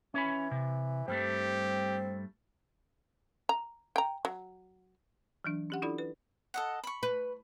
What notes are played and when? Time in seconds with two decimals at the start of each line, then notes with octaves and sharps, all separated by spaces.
0.14 E3 C#4 C#5 B5
0.51 C3
1.08 G2 G3 A3 C4 G4
3.49 A#5
3.96 G5 A#5
4.25 F#3
5.44 E3 F#3 D4
5.70 C#4 G4 F#5
5.82 D4 E4 F4 A4 D5 B5
5.98 B4
6.54 A4 D#5 F#5
6.84 B5 C#6
7.03 B4